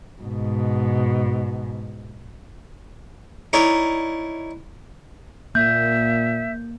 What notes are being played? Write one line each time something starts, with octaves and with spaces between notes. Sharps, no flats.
G#2 B2
D#4 E4 A#4 C#5 D5
A#2 A#3 E5 G6